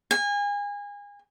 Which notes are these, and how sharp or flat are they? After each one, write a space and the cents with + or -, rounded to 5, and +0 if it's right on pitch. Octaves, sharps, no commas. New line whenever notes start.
G#5 -30